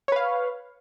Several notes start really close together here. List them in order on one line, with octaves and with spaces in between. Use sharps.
C#5 B4 F5